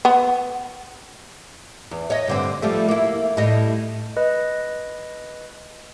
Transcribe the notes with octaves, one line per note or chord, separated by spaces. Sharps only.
B3
E2
C#5 D#5
G2 D3 C4
F3 G3 A3
A#3 E4
A2 G3 D#5
B4 D#5